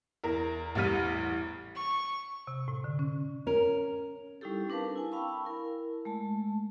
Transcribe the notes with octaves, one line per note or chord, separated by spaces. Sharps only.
E2 A#4
A1 E2 E3 G3 F6 D#7
C#6
C3
A2
D3
C#4
C#4 A#4
G3 C#4 D#4 E4 G4 A4
C4 D4 A#4 B4 F5 A5
E4 G#5
F5 G5 A5 B5 C#6 E6
E4 A#4
G#3 A3 A5